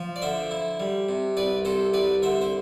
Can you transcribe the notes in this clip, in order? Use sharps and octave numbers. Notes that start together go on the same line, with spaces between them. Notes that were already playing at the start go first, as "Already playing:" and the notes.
Already playing: F3
D5
D3 C5 E5
E4
G3
C3
C2 B4 D5
C3 A4 C5
C2 B4 D5
D3 C5 E5
C5